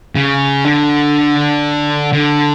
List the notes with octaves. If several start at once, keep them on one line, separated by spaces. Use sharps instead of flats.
C#3
D3
D3